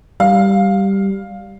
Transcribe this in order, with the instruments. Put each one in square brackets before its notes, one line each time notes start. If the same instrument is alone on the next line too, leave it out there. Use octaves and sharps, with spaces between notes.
[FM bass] G3 [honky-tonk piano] F5